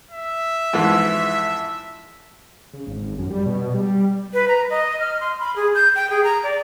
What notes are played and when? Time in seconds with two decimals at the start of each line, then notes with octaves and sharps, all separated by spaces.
0.11 E5
0.73 F2 G#2 E3
2.74 C#3
2.87 G#1
3.18 F#2
3.30 G3
3.46 B2
3.74 G3
4.34 B4
4.48 A#5
4.70 D#5
5.00 F6
5.21 C6
5.40 B5
5.56 G#4
5.75 G6
5.95 G5
6.10 G#4
6.24 A#5
6.43 D5